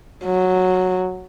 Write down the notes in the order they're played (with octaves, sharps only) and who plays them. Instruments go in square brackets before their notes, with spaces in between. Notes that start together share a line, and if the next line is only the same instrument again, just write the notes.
[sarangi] F#3